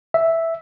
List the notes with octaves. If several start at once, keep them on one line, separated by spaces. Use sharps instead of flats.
E5